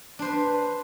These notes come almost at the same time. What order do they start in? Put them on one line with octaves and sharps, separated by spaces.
D4 C5 B4